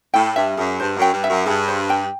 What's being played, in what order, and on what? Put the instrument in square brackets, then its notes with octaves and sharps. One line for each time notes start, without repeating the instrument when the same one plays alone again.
[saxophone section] A2 [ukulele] G5
[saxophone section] G2 [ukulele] E5
[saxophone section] F#2 [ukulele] G#4
[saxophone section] G2 [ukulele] C5
[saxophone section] F#2 [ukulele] G5
[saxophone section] G2
[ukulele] E5
[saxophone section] F#2
[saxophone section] G2 [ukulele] G#4
[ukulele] C5
G5